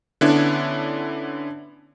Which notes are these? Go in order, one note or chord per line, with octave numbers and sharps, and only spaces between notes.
D3 B3 C#4 D4 E4